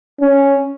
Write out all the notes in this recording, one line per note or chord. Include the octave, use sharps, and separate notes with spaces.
C#4